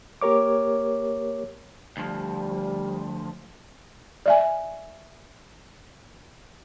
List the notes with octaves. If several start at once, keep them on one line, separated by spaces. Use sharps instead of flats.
A#3 G4 A#4 C#5 D6
D2 F3 G3
D5 E5 G#5